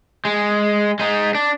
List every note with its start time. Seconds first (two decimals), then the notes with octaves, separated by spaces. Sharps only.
0.25 G#3
0.99 G#3 D#4
1.35 D4